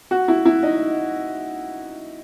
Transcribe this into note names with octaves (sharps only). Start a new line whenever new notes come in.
F#4
E4
E4
D#4